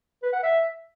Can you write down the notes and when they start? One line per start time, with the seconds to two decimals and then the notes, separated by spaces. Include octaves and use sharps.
0.23 B4
0.33 F#5
0.43 E5